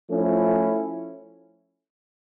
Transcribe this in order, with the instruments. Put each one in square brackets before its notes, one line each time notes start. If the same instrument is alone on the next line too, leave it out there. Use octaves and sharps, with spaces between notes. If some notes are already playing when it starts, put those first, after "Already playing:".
[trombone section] F3 A3 C#4 E4